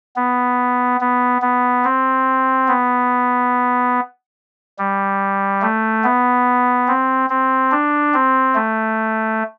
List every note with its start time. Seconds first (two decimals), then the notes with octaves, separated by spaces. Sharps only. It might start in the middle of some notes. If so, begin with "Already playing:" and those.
0.16 B3
1.01 B3
1.42 B3
1.84 C4
2.68 B3
4.78 G3
5.62 A3
6.04 B3
6.88 C4
7.30 C4
7.72 D4
8.14 C4
8.55 A3